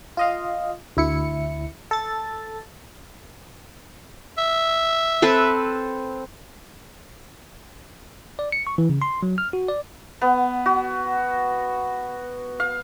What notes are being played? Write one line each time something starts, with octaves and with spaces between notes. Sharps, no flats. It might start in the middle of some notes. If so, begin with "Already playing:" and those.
F4 D#5 F5
D2 E4 C#7
A4 A6
E5
C4 A4 B4
D5
C#7
C#6
E3
C#3
C6
F#3
F6
F#4
D5
B3
F#4
F5